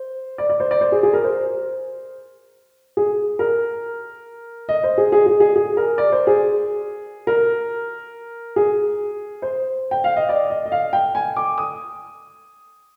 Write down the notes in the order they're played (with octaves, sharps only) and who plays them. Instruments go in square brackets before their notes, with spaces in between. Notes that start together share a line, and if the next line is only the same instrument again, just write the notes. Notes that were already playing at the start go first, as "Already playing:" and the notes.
Already playing: [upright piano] C5
D5
D5
C5
D5
C5
G#4
G#4
A#4
C5
G#4
A#4
D#5
C5
G#4
G#4
G#4
G#4
G#4
A#4
D5
C5
G#4
A#4
G#4
C5
G5
F5
D#5
D5
D#5
D#5
F5
G5
G#5
D6
D#6